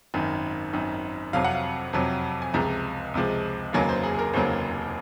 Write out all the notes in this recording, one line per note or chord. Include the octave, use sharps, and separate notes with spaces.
G#1 F#2 D#3
G#1 F#2 D#3
F2 C3 F#3 F5
F#5
F5
F2 C3 F#3
G#5
C#2 C3 F3 G#3 A#5
C#2 C3 F3 G#3
F1 D#2 C#3 F#3 A#3 G#5
C5
G#4
G#4
A#4
F1 D#2 C#3 F#3 A#3 C5